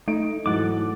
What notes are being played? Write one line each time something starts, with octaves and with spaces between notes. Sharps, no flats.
A3 D#4 D7
G#2 E3 F#3 A4 F#5 D6